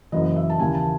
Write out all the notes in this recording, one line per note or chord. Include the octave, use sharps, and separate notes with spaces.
F#1 F#2 E3 D#5
E5
A5
D#2 C#3 E3 G#5
A5